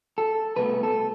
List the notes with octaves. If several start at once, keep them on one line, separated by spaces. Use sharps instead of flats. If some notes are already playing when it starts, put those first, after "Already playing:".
A4
C2 B2 A3 B4
A4